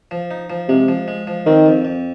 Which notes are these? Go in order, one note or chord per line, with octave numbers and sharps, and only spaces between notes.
F3
D#4
F3
C3 G#3
F3
G#3
F3
D#3 C4
F2
F2